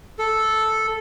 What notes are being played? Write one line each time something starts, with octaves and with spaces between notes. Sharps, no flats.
A4